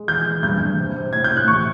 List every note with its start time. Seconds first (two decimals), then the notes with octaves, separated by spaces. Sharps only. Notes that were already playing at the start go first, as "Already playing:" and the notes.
Already playing: G#3
0.08 E2 G6
0.26 E2
0.43 G2 G6
0.61 G2
0.78 C3
0.95 C3
1.13 A2 G#6
1.24 G6
1.31 A2
1.37 F#6
1.48 E2 C#6